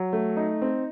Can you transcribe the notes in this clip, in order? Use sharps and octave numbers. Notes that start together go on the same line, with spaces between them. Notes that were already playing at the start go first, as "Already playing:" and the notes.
Already playing: F#3
A3
D#4
C4